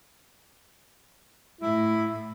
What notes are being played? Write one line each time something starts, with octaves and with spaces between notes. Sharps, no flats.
A2 E4